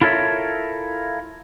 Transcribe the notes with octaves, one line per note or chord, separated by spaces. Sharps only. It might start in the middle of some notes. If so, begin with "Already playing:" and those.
E4 F4 A4 A#4 C#5 E5